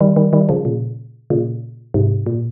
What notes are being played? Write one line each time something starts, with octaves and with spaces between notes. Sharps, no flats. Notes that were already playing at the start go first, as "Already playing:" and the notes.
D#3 G3
D#3 G3
D#3 G3
C#3 F3
A#2 C#3
A#2 C#3
G#2 C3
A#2